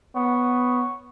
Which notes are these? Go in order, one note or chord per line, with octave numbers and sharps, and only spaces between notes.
B3 C#5